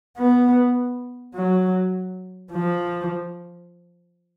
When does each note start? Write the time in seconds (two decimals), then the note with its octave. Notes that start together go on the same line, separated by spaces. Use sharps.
0.18 B3
1.35 F#3
2.52 F3